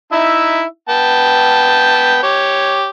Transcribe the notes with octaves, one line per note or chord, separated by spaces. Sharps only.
D#4 E4 E5
B3 G5 A5
G4 C#5